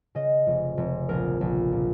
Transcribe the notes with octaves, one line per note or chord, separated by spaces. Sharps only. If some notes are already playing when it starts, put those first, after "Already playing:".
C#3 D#5
F1
F1
A#1 A#4
A#1
A#2